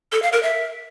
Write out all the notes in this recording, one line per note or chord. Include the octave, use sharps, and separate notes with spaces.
A4
F5
A#4
E5